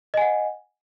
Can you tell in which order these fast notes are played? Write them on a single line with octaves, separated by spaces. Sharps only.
D#5 G#5 F#5